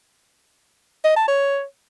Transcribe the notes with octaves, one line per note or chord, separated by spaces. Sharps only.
D#5
A5
C#5